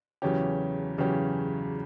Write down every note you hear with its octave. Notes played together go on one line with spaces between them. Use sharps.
E2 C#3 F#3 C#4 G4
E2 C#3 F#3 C#4 G4